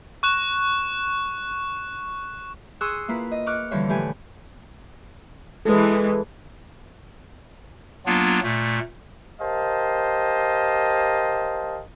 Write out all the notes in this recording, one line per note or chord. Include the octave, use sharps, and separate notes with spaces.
C#6 F#6 E7
G#4 C6 C#6 D#6 E6 F#6
A#3 E4 F4 B4
D#5
C#6 D6 F6 F#6
D3 E3 F3 G3 C#5
A2 G4 B4 G#5
E3 G#3 A4 B4
F#3 A#3 B3 D4 F4
A#2 A3
G4 A#4 C5 D#5 F5 A5